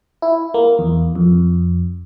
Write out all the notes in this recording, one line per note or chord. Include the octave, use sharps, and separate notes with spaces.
E4
A#3
E2
F2